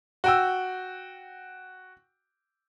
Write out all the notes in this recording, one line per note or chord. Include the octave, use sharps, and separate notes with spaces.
F#4 G5 E6